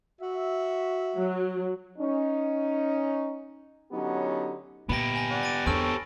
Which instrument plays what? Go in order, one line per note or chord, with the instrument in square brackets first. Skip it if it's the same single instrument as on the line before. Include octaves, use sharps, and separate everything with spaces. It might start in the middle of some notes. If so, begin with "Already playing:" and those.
[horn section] F#4 E5
[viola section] F#3
[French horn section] C#4 D#4
D3 F#3 B3 C#4 D#4 G4
[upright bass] A#2 [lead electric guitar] B3 G4 [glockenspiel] B5 A#6
[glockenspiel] G#5 A#6
[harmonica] D5 F#5
[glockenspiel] A6 D7 D#7
[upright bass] E2 D4 [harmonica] C4 A4 C#5 [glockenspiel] F6 D7